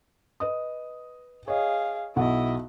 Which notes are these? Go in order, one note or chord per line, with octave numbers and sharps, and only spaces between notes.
B4 D#5 D#6
G#4 C#5 D#5 F5
B1 E4 F#4 D#5 F#5